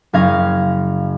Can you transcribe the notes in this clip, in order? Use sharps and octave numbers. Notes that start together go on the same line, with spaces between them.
F#1 C#4 F5 G#6 A#6